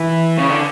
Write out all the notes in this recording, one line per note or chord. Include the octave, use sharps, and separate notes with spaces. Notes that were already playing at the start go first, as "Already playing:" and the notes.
Already playing: E3
C#3
D3